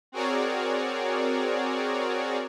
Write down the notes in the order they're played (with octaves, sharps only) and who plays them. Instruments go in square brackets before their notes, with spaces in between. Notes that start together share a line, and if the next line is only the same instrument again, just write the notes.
[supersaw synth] C4 F#4 G#4 A#4 C#5 D5